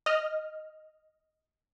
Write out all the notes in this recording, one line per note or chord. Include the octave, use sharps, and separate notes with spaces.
D#5 F6